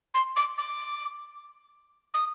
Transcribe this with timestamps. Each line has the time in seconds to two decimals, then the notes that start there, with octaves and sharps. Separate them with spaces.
0.14 C6
0.36 D6
0.58 D6
2.14 D#6